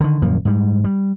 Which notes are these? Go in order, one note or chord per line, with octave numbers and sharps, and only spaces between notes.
D3 D#3
D#1 F#2 F3 A#3
G#2 G3
G3